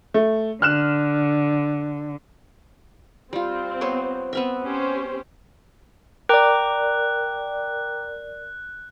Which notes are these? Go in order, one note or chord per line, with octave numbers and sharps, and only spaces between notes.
A3
D3 F6 F#6 E7
G3 C4 F4
B3 C5 C#5
B3 C4 E5
C#4 G4 C5
A#4 D5 G5 A#5 D6 F#6